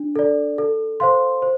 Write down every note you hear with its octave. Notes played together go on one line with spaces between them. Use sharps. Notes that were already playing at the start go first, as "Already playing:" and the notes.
Already playing: D4
A4 D5
A4
C5 F5 C6
C5